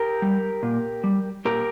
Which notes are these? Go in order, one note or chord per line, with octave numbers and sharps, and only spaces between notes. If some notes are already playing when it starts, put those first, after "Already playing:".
Already playing: G4 A#4
G3
A#2
G3
A#2 G4 A#4